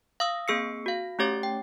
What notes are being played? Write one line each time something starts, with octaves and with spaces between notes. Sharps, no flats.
F5 D#6 E6
A#3 C4 G#4 E6 C7 C#7
F#4 F5
A3 C#4 G4 C#5 D6 A6
G5